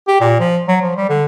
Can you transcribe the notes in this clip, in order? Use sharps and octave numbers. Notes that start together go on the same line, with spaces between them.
G4
A#2
F3
F#3
F3
G3
D3